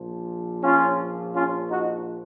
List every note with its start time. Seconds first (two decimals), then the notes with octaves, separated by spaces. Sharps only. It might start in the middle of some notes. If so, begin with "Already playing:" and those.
Already playing: A#1 A#2 F3
0.63 C#4 F4
1.33 C#4 F4
1.69 D#4 F#4